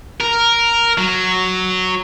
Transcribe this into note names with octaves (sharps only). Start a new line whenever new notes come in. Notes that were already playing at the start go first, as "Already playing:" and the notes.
A#4
F#3